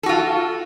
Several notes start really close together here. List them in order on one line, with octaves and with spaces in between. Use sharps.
A4 F#4 F4